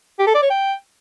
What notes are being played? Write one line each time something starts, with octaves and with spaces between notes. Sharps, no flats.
G4
A4
D5
C#5
G5